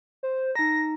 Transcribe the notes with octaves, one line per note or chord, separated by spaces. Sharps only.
C5
D#4 A#5 A#6